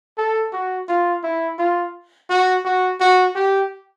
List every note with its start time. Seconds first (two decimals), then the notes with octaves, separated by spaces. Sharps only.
0.18 A4
0.53 F#4
0.88 F4
1.23 E4
1.59 F4
2.29 F#4
2.65 F#4
3.01 F#4
3.36 G4